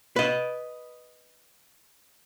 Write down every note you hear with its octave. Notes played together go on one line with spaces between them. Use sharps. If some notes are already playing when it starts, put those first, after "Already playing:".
B4 D#5